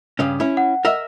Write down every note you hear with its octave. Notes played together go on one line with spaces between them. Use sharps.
G2 C#3 C#4
C#4 E4
F#5
A#4 D#5 E5